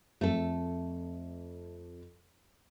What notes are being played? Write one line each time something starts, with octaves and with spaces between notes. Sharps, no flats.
F2 A3 A4